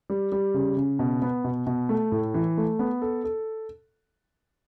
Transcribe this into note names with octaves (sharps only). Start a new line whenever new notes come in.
G3
G3
C#3
C#3
B2
B3
B2
B2
A3
A2
E3
A3
B3
A4
A4